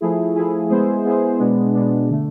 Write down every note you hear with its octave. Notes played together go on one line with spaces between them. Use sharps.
F3 A3 E4 G#4
F3 A3 E4 G#4
G#3 B3 E4 G#4 C5
G#3 B3 E4 G#4 C5
B2 G#3 B3 D4
B2 G#3 B3 D4
D3 A3